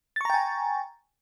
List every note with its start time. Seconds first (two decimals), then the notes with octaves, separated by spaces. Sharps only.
0.16 A6
0.21 C#6
0.25 A#5
0.30 G5
0.34 G#5